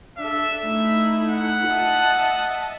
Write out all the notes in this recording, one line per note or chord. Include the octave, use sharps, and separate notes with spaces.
D4 A4 E5
A3 D#4 E4
F#5
D#5 E5 A5